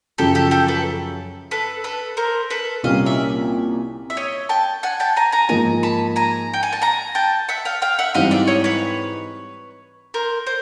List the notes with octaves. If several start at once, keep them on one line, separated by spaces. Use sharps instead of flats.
F#2 C#3 F3 G4 A4
G4 A4
G4 A4
A4 B4
A4 B4
A4 B4
A#4 C5
A4 B4
C2 A#2 G3 A#3 C#4 D#5 F5
D5 E5
E5
C#5 D#5
G5 A5
F#5 G#5
G5 A5
G#5 A#5
G#5 A#5
G#2 F3 A#3 D#4 G#5 A#5
A5 B5
G#5 A#5
G5
G#5
A5
G#5 A#5
G5 A5
E5 F#5
F5 G5
F5 G5
E5 F#5
G#2 E3 G3 C4 D#5 F5
D5 E5
C#5 D#5
B4 C#5
A#4 C5
C5